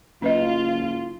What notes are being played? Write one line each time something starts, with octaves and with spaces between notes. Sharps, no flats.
F#1 C#4 F4 B4 D#5